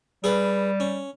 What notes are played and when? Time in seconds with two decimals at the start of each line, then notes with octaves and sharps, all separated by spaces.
0.24 G3 G#4 B4
0.80 C#4